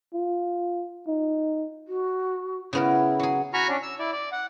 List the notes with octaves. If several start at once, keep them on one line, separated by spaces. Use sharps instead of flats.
F4
D#4
F#4
C#3 B3 E4 A#4
F#3 G#4
F#4 G#5 A#5 B5 C#6 F6
C#4 D4
E6
E4 D5
D5
F#5